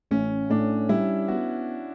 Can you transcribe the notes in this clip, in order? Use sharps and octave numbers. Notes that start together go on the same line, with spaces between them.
A1 C#4
A2 D4
G3 E4
B3 F#4